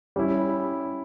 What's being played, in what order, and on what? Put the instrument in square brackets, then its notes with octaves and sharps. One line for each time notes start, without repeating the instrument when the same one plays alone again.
[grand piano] G3 C#4 E4